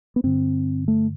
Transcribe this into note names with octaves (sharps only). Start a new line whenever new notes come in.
B3
G2 D3 C4
A3